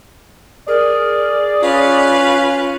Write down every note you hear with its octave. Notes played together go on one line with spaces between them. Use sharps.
G#4 A#4 D5
C#4 F4 B4 F5